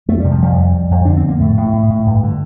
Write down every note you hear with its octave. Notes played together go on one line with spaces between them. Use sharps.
F2 A3
C3 G3
F3
F2 G3
F2
F2
F2
D3 D4
C4
F2
A#3
A2 A3
A2
A2
A2
G2
D3